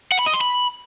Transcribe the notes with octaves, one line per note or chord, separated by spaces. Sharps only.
F#5
B5
D#5
C6
B5